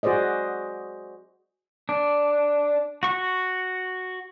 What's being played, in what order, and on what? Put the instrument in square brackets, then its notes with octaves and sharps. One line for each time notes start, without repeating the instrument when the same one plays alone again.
[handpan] F#4 G#4 C5 D5 D#5
[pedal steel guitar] D4
F#4 C#6